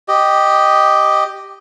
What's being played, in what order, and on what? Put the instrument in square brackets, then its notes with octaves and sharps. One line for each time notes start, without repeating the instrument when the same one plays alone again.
[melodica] G4 D#5